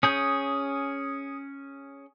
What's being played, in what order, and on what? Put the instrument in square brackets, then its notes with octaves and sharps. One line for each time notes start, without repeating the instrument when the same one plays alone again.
[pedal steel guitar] C#4 G#4 G6 [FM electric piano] D#6